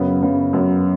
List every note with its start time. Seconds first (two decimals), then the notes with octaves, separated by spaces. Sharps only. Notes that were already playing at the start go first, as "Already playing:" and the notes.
Already playing: F#2 C#3 B3
0.22 F#2 C#3 B3
0.53 F#2 C#3 B3